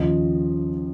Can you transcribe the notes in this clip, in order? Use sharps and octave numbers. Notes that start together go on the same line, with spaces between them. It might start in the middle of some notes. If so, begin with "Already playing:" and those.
Already playing: D#2 C#3 F3 D#5